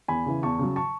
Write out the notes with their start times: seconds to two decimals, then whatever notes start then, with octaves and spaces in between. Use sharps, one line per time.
0.08 E2 G#5 B5
0.26 C#3 E3
0.43 E2 A5 C#6
0.59 C#3 F#3
0.76 A5 C#6